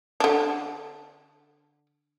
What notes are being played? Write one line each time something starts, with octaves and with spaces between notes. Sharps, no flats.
D3 D4